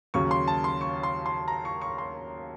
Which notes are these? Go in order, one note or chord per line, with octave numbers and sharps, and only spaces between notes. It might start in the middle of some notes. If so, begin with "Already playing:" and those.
D#2 C#3 F#3 C#6
C6
A5
C6
C#6
C6
C6
A#5
C#6
C#6
C6